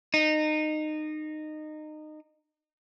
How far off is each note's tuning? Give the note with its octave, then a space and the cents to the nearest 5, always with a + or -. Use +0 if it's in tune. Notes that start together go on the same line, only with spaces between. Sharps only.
D#4 -20